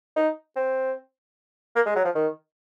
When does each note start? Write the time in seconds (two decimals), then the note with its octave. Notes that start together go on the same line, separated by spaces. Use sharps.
0.16 D#4
0.56 C4
1.76 A#3
1.86 G#3
1.95 F#3
2.05 F3
2.15 D#3